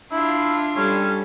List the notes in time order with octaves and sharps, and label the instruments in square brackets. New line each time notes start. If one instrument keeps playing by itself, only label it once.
[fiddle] D4 F4 [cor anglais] E4
[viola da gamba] G3 A4 [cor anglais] C#4